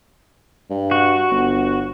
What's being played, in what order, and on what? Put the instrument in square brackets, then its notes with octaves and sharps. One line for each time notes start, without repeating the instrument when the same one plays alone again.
[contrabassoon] G2
[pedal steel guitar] F#4
[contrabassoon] G1